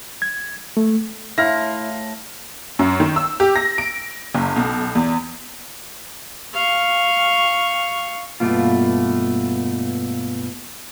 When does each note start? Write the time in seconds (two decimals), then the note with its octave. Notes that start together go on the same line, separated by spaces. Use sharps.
0.22 G#6
0.77 A3
1.38 A2 E4 F5 A5 C6 F6 A#6
2.79 F#2
3.00 D#3
3.16 E6
3.40 G4
3.56 A#6
3.78 D7
4.35 F#1
4.56 B1
4.95 E2
6.54 F5 C#6
8.40 G2 B2 D#3 A3 A#3 F4